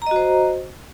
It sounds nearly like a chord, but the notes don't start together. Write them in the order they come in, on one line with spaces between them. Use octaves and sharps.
A#5 D#5 F#4 C5